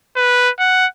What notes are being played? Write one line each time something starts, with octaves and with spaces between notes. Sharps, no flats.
B4
F#5